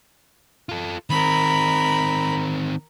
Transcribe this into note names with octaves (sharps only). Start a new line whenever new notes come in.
F4 A4
D#3 C4 A#4 B5